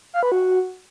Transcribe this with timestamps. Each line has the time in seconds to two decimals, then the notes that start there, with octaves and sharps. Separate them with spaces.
0.14 F5
0.23 B4
0.32 F#4